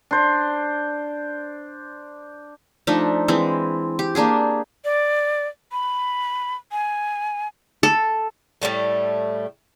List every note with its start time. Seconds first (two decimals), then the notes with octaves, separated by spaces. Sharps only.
0.11 D4 C5
2.87 F3 A3 D4 D#4
3.28 E3 G#3 C4
3.99 G4
4.15 A#3 D4 G4 G#4
4.85 D5
5.72 B5
6.72 G#5
7.83 A4
8.62 A2 D#3 G3 A3